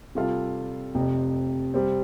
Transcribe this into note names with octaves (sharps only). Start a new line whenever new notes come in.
C3 G3 F4 A4 F5
F1 F2 C3
C3 G3 C4